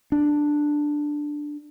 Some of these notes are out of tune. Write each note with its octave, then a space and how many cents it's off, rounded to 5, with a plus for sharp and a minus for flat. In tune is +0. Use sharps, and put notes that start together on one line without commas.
D4 +5